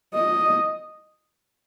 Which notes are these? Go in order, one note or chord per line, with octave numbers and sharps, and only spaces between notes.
D#5